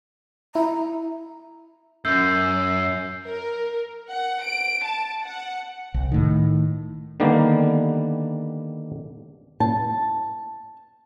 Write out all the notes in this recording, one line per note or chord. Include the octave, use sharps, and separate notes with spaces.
E4 A#5
F#2 E6 G6 C7
A#4
F#5
D7
A5
F#5
C2
A2 D#3
D3 D#3 G3 A#3 B3
A5